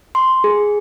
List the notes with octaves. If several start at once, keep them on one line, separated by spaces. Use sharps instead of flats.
C6
G#4